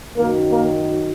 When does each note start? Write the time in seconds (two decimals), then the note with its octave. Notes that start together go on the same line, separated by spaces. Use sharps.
0.16 F#2 D#3 F#3 A#3 A#4
0.51 A#3 A#4